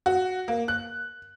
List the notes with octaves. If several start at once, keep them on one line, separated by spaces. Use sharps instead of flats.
F#4
A#3
F#6